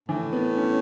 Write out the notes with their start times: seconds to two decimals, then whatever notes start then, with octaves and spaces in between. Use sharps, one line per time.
0.09 A2 E3
0.33 B3
0.57 C#4